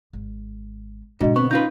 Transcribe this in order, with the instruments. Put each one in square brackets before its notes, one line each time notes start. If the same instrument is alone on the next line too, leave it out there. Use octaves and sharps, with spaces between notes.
[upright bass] G#1
[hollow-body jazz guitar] G#2 [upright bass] B2 D3 [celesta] D4 F#4 D#5
[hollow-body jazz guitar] B3 [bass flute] C4 [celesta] C#6
[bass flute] C#4 [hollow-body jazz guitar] D#4 F4 B4 [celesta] G6